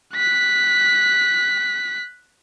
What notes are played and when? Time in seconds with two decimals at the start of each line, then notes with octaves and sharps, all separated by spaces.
0.15 F#6 B6